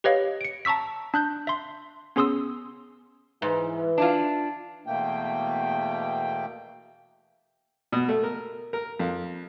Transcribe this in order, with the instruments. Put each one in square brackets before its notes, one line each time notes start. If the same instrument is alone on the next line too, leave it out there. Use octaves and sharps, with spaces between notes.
[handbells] G4 B4 C#5 D#5 F5
C#7 D7
A5 A#5 C#6 E6 B6
D4 F#6 G6
E5 C6
B3 C#4 G#4 C6 D#6 E6
[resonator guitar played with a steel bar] G#2 [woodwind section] E3
[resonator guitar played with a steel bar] D4 E4 F4
[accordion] E2 B2 A3 A#3 G5
[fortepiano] B2
A3
A#4
A#4
F2